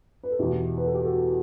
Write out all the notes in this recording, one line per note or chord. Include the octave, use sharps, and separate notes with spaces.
B4
A4
E2 B2 E4 G4
B4
A4
G4
F#4 A4